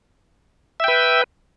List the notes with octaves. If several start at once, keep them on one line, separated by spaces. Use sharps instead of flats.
B4 E5 G5